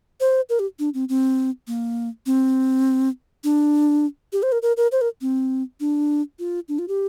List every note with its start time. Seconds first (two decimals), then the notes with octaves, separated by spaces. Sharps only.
0.20 C5
0.49 A#4
0.59 G4
0.79 D4
0.94 C4
1.09 C4
1.67 A#3
2.26 C4
3.44 D4
4.33 G4
4.43 C5
4.52 A#4
4.62 A#4
4.77 A#4
4.92 C5
5.01 A#4
5.21 C4
5.80 D4
6.39 F4
6.68 D4
6.79 F4
6.88 G4